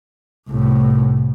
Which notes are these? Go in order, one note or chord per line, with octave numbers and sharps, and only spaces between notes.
C2 A2